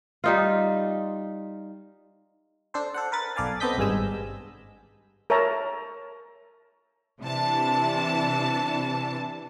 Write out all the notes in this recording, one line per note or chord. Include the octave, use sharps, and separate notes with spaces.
G3 D#4 F4
D4 A4 C5
A4 C5 F#5
A#4 B4 A6
B1 A4 D5 F5 G#5
B3 C4 A4 D#5 G6 B6
G#1 G2 G#3 G#5 E6
A#4 C#5 E5 A5 A#5
C3 E3 D4 A5